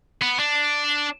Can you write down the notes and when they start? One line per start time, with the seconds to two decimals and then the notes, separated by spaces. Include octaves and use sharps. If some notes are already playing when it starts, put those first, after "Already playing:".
0.22 B3
0.39 D4